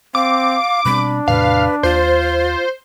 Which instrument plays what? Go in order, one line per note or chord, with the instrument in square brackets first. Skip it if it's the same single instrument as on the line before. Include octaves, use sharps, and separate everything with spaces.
[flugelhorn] C4 [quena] F5 [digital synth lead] D6
[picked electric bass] B2 G3 C4 [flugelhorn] D4 [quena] B5
[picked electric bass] E2 A2 C3 [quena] B4 [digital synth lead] F5
[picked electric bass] D#2 [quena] F4 [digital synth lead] C5